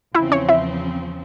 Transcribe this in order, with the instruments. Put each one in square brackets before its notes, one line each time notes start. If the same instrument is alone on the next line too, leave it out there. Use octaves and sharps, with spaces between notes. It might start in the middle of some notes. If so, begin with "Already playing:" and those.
[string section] E2 C#3 F3 C4 [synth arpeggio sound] E4 E5
[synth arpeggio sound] C#4 C#5
E4 E5